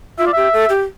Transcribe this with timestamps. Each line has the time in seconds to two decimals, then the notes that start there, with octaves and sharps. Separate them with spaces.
0.19 F4 E5
0.27 D5
0.33 G4 E5
0.53 A4
0.69 G4